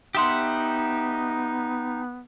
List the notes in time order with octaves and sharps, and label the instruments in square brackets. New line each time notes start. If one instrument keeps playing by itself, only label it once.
[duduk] B3 [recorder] D#4 [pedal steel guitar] G4 E5 F#5 [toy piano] C6 D#6